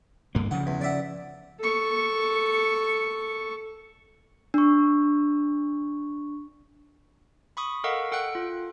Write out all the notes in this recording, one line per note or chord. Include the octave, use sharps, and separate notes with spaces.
G2 A#3
C#3 F3 F#5
E2
D5 E5 F#5
A4 C#6
D4 C#6
B5 C#6 D#6
A4 A#4 D#5 F5 F#5 C#6
A4 F#5 G5 F#6
F4